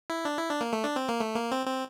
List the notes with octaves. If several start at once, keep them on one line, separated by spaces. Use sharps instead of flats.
E4
D4
E4
D4
A#3
A3
D4
C4
A#3
A3
A#3
C4
C4